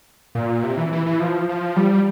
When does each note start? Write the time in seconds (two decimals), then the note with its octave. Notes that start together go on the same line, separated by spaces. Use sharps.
0.35 A#2
0.63 C3
0.78 E3
0.93 E3
1.06 E3
1.20 F3
1.49 F3
1.76 G3